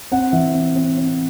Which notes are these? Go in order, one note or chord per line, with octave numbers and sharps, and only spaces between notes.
C4 F#5
E3 E5
C4
C4
C4